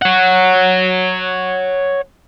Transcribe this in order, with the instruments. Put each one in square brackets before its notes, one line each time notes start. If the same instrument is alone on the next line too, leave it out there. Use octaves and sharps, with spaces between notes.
[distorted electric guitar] C#5 F#5